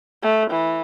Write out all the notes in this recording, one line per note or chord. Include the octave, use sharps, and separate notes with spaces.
A3
E3